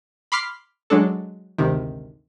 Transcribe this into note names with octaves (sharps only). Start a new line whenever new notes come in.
B5 C6 D6 F6 B6 C7
F#3 G#3 D4 A4
G#1 D2 C3 D#3